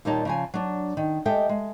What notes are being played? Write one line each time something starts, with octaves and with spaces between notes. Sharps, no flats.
D#2 A#2 G3 D#4 C#5 A5
C#3 F3 G#5
F#3 D4
D#3
G#3 G4 A4 D#5 E5 G5
G#3